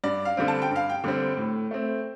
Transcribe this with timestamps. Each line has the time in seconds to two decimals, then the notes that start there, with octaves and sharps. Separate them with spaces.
0.04 G2 D5
0.25 F5
0.37 D3 G3 C4
0.48 A5
0.62 G5
0.70 G2
0.76 F5
0.89 G5
1.04 D3 G3 C4
1.37 A2
1.71 A3 C4